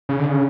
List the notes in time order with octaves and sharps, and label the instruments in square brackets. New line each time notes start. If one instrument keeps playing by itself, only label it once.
[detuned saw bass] C#3
D3
C#3